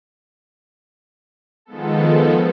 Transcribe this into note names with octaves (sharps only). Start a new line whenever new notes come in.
D#3 F3 G#3 B3 A4